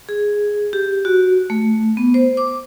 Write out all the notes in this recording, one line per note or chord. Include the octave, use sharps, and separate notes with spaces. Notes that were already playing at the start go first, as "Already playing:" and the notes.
G#4
G4
F#4
A3
B3
C5
D6